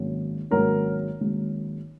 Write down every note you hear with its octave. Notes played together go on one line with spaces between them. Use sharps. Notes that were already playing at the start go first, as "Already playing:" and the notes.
Already playing: G#1 G#2 F#3 A#3 C#4
G#1 G#2 F#3 A#3 C#4 A#4
G#1 G#2 F#3 A#3 C#4